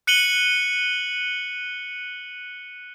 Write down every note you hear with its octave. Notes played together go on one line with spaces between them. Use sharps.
F#6 C#7 D#7 F#7 G7